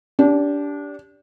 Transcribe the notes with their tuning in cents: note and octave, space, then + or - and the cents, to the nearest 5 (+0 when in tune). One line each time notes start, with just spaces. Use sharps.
D4 -25 G4 +0